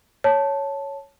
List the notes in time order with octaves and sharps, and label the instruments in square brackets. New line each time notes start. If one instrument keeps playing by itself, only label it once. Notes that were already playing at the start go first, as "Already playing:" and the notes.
[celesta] C#5 A5